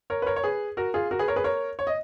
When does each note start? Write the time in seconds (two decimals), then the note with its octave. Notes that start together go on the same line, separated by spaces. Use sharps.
0.10 A#4 C#5
0.22 B4
0.26 A#4 C#5
0.36 C#5
0.44 G#4 B4
0.77 F#4 A#4
0.94 F4 G#4
1.11 F#4 A#4
1.19 G#4 B4
1.28 A#4 C#5
1.36 G#4 B4
1.44 A#4 C#5
1.79 C#5
1.87 D#5